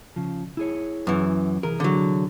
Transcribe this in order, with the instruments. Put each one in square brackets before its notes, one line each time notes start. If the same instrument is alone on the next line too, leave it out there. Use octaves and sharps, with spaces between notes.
[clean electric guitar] C#3 F3
E4 G#4 C#5
[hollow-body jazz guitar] F#2 E3
[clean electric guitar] C2 E3 G#4 [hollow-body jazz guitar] A#4
[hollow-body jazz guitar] D3 F#3